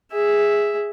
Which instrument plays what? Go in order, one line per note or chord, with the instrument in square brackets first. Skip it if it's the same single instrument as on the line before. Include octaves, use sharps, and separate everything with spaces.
[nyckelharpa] G#4 E5